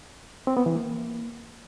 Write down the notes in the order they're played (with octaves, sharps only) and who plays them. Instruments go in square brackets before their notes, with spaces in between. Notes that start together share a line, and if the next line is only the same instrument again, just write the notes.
[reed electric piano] C4
B3
E3
A#3